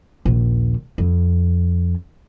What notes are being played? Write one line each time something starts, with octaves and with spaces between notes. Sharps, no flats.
A#1 D#2
F2